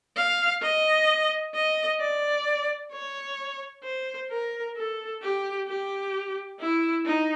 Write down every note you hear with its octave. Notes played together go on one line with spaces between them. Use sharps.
F5
D#5
D#5
D5
C#5
C5
A#4
A4
G4
G4
E4
D#4